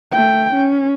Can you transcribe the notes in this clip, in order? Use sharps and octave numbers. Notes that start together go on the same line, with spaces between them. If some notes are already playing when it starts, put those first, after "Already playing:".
A3 G5
C#4